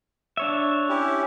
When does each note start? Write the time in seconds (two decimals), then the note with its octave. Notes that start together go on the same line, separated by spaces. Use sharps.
0.37 D4 C#5 E5
0.89 C#4 E4 G4